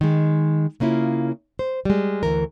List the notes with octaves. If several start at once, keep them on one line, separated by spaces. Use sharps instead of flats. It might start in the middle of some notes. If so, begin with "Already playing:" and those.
D#3 G#3
C#3 A#3 C#4 E4 F4
C5
G3 G#3
D2 E3 A#4